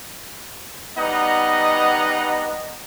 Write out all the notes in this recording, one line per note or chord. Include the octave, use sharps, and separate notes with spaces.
G3 B3 D#4 D#5 F#5 A#5